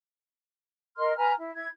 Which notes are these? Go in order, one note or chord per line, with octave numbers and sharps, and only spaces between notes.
A#4 D#5 C6 F6
B4 G#5 A#5 F6
E4
E4 G#6